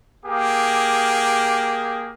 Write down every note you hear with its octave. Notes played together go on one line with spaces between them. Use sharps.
A#3 G4 G#4